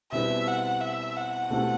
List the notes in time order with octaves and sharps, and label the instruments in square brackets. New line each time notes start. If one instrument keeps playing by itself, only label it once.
[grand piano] B2 G3 C4 E4 B4 [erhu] E5
[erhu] F#5
E5
F#5
[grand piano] B2 A3 C4 E4 G4